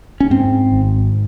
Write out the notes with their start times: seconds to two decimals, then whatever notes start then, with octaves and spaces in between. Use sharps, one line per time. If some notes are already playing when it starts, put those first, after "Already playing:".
0.20 C#4
0.30 G#2 C4
0.72 G#1